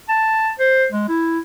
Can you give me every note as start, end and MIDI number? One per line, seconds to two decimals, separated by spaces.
0.09 0.50 81
0.59 0.86 72
0.92 1.08 56
1.09 1.39 64